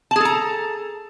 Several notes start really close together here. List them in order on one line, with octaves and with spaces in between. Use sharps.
A5 G#4 A4 A#5